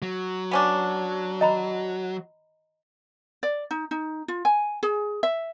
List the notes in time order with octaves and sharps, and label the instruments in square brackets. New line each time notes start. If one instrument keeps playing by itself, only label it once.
[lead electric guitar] F#3
[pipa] B3 C#4 D4
[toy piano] D#5 A#5 B5
[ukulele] D5
D#4
D#4
F4
G#5
G#4
E5